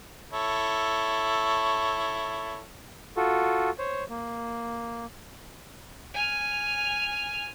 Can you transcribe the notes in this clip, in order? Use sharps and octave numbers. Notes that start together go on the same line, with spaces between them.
E4 A4 C#5
F4 F#4 A4
C5 C#5
A#3
G#5 F6